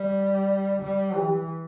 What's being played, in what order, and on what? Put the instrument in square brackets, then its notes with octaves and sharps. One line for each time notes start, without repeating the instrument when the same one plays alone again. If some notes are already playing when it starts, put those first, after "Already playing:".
Already playing: [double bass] G3
G3
[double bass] E3 [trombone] G4